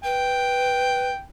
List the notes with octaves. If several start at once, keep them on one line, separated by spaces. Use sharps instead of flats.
B4 G5